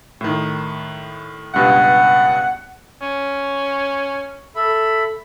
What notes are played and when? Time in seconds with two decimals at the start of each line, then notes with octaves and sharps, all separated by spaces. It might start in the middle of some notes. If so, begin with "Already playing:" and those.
0.21 A2 D#3
1.54 C#2 G2 B2 F#5
3.02 C#4
4.56 A4 E5 B5